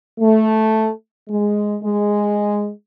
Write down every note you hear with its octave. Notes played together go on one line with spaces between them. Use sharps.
A3
G#3
G#3